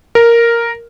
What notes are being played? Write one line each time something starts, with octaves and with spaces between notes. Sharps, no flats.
A#4